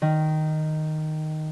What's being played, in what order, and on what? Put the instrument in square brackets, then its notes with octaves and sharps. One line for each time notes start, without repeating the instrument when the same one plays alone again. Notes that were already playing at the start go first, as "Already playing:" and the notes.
[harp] D#3